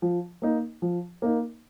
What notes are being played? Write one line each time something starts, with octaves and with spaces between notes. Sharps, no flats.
F3
A#3 D#4
F3
A#3 D#4